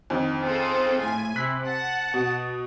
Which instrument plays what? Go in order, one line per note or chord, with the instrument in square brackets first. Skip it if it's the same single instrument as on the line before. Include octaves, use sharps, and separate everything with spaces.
[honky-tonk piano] F2 D3 D#3
[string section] C4 G#4 A4 [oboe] F4
[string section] A2 G#5
[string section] C3 [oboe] E4 [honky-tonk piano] F#6 B6
[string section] F#5 [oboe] A5
[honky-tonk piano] B2